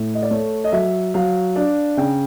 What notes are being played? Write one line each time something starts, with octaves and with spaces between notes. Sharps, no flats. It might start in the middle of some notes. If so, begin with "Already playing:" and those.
Already playing: A2
D#5
D5
A3 C#5
D#5
F#3 E5
F#3 F5
D4
C#3 G5